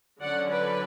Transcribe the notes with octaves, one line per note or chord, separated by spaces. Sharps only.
D3 F#3 C#4 D5 F#5
B4 D5